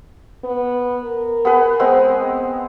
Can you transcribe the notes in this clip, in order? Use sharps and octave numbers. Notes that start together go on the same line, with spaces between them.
B3
A#4
B3 G#4 B4
G#3 B3 C4